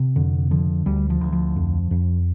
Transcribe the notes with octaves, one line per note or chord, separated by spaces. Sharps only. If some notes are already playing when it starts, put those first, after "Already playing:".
Already playing: C3
F2 D3
D3 F3
D2 G3
F3
D2
F3
F2
F2